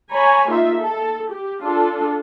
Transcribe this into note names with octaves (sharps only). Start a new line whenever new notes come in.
C#5 G#5 A#5 B5
A#3 D#4 F4 E5
A4
G4
D4 F4 A4